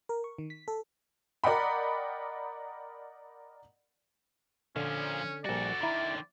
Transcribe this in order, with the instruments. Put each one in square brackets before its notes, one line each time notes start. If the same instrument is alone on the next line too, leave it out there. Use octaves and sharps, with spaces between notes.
[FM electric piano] A#4
C#6
D#3
B6
A4
[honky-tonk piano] A#4 D5 D#5 F#5 G5 B5
[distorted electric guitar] A#2 F3 [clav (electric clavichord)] D3 [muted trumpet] C#4
[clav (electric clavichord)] A#1 G3 [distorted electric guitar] F#4 A4 [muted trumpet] D5
[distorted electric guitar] D3 D#3 [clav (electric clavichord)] E4 A#5